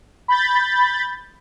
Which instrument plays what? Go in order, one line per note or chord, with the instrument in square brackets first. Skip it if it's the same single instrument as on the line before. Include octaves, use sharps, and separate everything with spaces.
[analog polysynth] B5 G6 A6